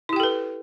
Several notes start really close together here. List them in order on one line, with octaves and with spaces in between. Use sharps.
E4 G4 G5 A4 B4